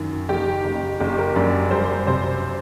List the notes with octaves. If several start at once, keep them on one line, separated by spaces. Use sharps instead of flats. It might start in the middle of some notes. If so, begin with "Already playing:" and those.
Already playing: F#2 D#3
F#1 G4
F#1
F#1 G4
A#4
F#2 D5
G3 C5
C3 C5